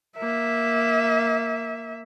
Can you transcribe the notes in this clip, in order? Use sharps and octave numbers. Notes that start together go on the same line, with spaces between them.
A#3 E5